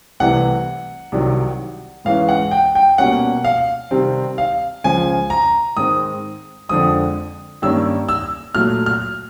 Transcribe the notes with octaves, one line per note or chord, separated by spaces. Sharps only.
C2 C3 E3 A3 F#5
C2 C3 D#3 F#3
G#2 E3 G#3 C#4 F5
F#5
G5
G5
B2 G3 A#3 C#4 F#5
F5
C3 D#3 G3 C4
F5
C#2 C#3 F3 G#5
A#5
G#2 D#3 G#3 C4 D#6
F2 D3 F3 G#3 D#6
G2 D#3 G3 A#3 C#4 E6
E6
A#2 F#3 A3 F6
F6